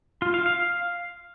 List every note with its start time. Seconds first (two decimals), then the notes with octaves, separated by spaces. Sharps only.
0.22 F4
0.34 F5
0.46 F5